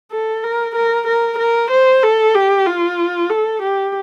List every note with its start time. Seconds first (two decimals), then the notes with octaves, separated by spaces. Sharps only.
0.12 A4
0.44 A#4
0.76 A#4
1.07 A#4
1.38 A#4
1.71 C5
2.03 A4
2.35 G4
2.66 F4
3.30 A4
3.62 G4